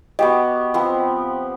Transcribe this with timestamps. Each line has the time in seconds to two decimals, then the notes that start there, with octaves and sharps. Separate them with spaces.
0.19 B3 F#4 G4 D#5
0.74 F3 B3 C4